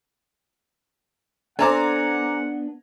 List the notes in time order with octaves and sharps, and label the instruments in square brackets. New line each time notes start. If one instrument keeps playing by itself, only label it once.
[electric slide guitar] B3 D4 [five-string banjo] C4 A4 [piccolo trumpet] F#5 [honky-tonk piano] G#5 A#5 D6